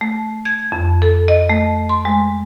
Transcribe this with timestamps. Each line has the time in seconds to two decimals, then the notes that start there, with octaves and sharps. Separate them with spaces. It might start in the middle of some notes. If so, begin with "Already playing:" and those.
0.01 A3
0.45 G#6
0.72 F2
1.02 A4
1.28 D#5
1.49 A3
1.89 C6
2.05 G#3